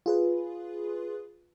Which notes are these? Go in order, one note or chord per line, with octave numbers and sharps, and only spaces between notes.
F4 G#4 B4